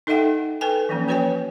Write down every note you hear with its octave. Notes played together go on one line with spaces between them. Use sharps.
D#4 A4 D#5 E5 F#5 G5
A4 B4 G5 G#5
E3 F3 A#3 C#4
A#3 F#4 B4 C#5 G5 G#5